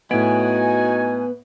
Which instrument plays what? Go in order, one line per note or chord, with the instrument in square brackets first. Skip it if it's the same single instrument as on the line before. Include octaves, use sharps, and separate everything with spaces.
[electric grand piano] A2 D7 [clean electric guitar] B3 [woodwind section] D#4 F#4 G#5